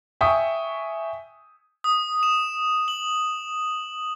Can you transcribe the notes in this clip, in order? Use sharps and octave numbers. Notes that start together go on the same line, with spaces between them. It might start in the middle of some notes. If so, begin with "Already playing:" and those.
E5 G5 G#5 C#6 D#6
D#6
E7
F#7